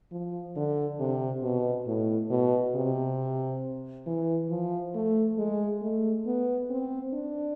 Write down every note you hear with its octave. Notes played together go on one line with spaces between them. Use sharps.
F3
D3
C3
B2
A2
B2
C3
E3
F3
A3
G#3
A3
B3
C4
D4